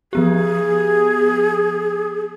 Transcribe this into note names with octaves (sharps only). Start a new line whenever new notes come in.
F3 B3 G4 G#4